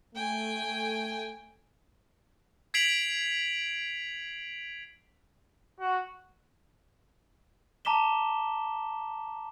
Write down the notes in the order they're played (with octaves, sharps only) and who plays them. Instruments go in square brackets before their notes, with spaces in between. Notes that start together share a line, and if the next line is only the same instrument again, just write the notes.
[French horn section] A3 [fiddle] G5 G#5
[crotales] G#6 B6 C7 D7 F7 F#7
[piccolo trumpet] F#4
[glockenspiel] A5 A#5 D6 B6 E7 G7